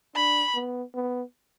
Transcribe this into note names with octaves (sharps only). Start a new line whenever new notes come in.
D4 B5
B3
B3